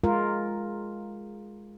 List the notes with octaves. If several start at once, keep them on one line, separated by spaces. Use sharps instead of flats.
G#3 F4 A#4